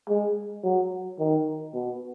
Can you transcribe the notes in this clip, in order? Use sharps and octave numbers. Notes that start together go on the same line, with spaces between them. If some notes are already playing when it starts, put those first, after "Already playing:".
G#3
F#3
D#3
B2